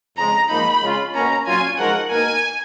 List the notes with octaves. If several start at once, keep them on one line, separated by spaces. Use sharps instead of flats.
F2 C#3 G#3 A#5
G#2 F3 A#3 D#4 B5
C#3 G#3 C#4 F4
B2 A#3 C#4 A#5
A#2 F#3 C#4 F4 G#5
F3 G#3 D#4 F#4 A#4 F#5
B2 A#3 D#4 A#4 G#5